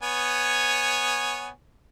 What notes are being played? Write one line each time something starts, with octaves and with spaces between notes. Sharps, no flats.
B3 C#5 G#5